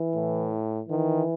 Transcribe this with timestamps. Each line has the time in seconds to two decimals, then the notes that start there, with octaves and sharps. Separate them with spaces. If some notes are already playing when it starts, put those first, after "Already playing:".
Already playing: E3
0.15 A2
0.89 D#3 E3